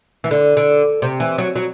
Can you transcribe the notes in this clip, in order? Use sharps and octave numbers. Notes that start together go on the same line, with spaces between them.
E3
D3
D3
C3
E3
F#3
F#3